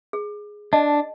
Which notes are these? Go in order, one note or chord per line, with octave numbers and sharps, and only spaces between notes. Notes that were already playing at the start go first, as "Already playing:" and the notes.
G#4
D4 D#5 A5